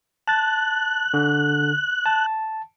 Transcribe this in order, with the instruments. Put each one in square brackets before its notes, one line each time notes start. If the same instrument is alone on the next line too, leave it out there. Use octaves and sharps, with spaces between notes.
[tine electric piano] A5 A6 [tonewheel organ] F#6
[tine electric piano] D3
A5